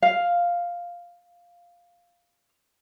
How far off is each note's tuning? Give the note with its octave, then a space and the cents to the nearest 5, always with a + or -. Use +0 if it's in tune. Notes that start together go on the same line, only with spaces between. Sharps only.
F5 +0